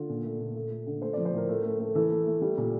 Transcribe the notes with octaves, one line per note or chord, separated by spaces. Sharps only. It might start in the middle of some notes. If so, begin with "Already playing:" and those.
Already playing: D3 F4
A#2
A3
A#2
A3
A3
D3
A3 C5
F3 D5
C5
A2 A#4
A3
A3
A3
E3 A4
A3
A3
G3
A#2